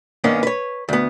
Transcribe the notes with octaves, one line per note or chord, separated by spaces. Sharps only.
G2 D#3 A#3 B3 C#4
B4 C#5
D2 B3